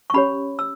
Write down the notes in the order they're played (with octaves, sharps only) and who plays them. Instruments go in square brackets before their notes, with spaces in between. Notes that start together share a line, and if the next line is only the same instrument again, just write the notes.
[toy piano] C#6
C#4 G4 C#5 B5
E6